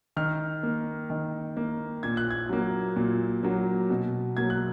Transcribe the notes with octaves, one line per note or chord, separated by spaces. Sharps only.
D#3 F6
A#3
D#3
A#3
A#2 G#6
F#6
G#6
F#3 A#3
A#2
F#3 A#3
B2
F#3 A#3 G#6
F#6